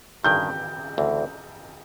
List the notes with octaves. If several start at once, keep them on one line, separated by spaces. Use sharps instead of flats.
G2 D#3 F#3 G6
D2 C#3 E3 A3 C4